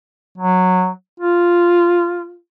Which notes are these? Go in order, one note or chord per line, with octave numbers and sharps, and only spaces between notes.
F#3
F4